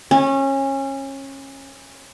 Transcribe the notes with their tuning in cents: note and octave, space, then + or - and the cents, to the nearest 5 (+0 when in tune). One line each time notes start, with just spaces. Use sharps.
C#4 -25